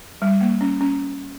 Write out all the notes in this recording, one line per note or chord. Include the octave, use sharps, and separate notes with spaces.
G3
A#3
C#4
C#4